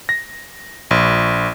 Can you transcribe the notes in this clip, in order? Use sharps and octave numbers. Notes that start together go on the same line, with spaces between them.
A#6
A#1